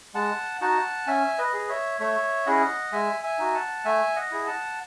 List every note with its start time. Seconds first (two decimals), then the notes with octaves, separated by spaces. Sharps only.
0.14 G#3 F#5 A5
0.61 D#4 F#4 F#5 A5
1.07 C#4 E5 G#5
1.38 B4 D#5
1.53 G#4
1.69 C#5 E5
2.00 A3 C#5 E5
2.46 C#4 E4 G#4 D#5 F#5
2.92 G#3 E5 G#5
3.23 E5 G#5
3.39 D#4 F#4
3.54 F#5 A5
3.85 A3 E5 G#5
4.16 D#5 F#5
4.31 E4 G#4
4.47 F#5 A5